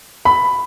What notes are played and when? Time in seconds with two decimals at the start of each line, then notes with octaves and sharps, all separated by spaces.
0.25 B5